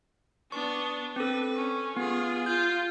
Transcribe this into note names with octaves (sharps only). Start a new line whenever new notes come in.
B3 D4 C#6
C4 A4 B4
C#4
B3 F4 G#4
F4 G6